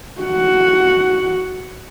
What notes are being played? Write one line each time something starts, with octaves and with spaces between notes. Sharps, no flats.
F#4 F#5